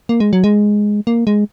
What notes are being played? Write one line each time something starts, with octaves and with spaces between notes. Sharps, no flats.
A#3
G#3
F#3
G#3
A#3
G#3